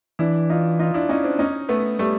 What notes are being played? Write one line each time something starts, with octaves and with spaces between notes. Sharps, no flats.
E3 D4 E4
D#4 F4
D#4 F4
D4 E4
C#4 D#4
C4 D4
C#4 D#4
A3 B3
G3 A3